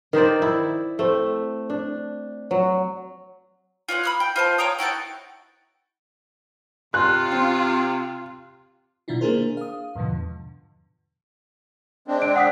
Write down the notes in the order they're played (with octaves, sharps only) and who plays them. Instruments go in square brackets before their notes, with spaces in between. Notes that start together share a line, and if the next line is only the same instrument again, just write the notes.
[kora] D#3 D#4 C5 D5
E4
A3 C4
D4
F#3
[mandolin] F4 C#5 D5 F#5
B5 D#6 F6
G5
F4 C5 A5
C#5 G5 A#5 D#6
E4 F#4 G5 A5
[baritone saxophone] C3 [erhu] F4 [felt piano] C6 F#6
[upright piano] C4
[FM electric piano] B2 D#3 D4 E4 F4
A#3 D4 G#4 A#4 C5
F5 D#6
E2 G#2 B2 D3 F3
[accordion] G#3 C4 D4
[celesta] D7
F#5 D#6 B6